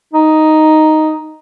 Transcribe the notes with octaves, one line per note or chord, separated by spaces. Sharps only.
D#4